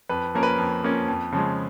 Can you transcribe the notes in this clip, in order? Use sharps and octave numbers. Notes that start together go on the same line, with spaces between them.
F2 B4
F3 A#3 C#4 A#4
B4
F2
F3 A#3 C#4
F2
C#3 F3 G#3